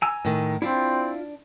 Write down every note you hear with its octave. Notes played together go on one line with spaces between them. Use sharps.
G#5 A#5 E6
A2 D#3
C4 D4 E4 F4 D5